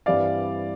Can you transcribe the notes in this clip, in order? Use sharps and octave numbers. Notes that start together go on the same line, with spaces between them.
G2 E3 G3 C4 E4 D5 F5